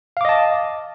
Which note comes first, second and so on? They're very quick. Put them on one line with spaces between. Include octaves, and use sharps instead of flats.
F5 D6 D#5 A5